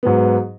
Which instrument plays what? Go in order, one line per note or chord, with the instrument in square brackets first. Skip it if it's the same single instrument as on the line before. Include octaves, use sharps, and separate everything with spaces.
[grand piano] G#2 F#3 B3